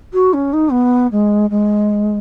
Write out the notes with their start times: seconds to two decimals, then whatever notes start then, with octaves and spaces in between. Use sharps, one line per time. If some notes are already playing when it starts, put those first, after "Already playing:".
0.13 F#4
0.33 C#4
0.53 D#4
0.71 B3
1.11 G#3
1.50 G#3